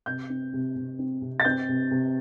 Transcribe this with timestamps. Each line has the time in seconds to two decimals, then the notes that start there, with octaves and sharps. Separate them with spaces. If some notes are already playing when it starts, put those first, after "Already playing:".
0.06 C3 G6
0.30 C4
0.53 C3
0.76 C3
0.99 C4
1.22 C3
1.40 A6
1.45 C4 G6
1.69 C3
1.91 C3